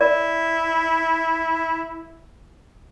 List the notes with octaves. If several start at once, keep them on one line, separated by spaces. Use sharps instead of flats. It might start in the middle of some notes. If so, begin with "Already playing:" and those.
E4 D5